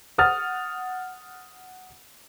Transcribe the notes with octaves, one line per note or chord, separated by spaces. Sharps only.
F#5 D#6 F6 A6